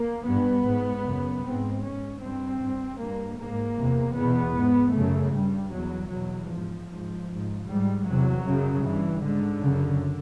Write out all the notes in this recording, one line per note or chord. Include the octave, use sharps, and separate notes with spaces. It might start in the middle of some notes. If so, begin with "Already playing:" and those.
Already playing: A#3
G2 B3
G#2
F#2 C#3
G#2 C4
G#2 C#4
G2 C4
G2
G2 A#3
G#2 A#3
E2 C3
E2 B2 B3
G#2
F#2 C#3 A3
G2 G3
E2 B2 F#3
E2 B2 F#3
G#2 F3
G#2
G#2
G#2 G3
E2 C3 F#3
F#2 C#3
G2 E3
G#2 D3
F#2 C#3